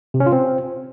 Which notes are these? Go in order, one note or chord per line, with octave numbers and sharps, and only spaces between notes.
C3
C#4
F4
C4